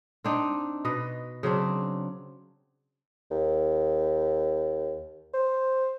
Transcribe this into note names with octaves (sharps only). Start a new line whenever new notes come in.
C4 D4 D#4
B2 B4 D#5
C#3 F#3 C4 D4
D#2
C5